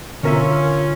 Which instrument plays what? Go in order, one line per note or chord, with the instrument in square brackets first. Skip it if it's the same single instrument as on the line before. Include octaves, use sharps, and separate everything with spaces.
[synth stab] B2 A#4 E5 [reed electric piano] D3 [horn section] C#4 [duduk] F4